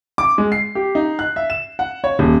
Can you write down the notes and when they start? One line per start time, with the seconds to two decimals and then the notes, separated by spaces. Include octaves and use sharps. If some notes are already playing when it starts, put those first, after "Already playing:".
0.18 D6
0.38 G#3
0.52 C7
0.75 G4
0.95 D#4
1.19 F#6
1.36 E5
1.50 E7
1.79 F#5
2.04 C#5
2.19 D#1